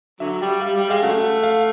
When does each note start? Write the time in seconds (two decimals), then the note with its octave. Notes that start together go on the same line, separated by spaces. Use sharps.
0.20 D3 F#3 E5
0.41 G3
0.61 G3 F5
0.75 G3
0.89 G#3 F5
1.02 C#3 F#3 A3 F#5
1.44 F5